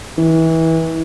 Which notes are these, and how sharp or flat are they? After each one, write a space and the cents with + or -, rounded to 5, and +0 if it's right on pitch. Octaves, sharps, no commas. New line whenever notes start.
E3 -25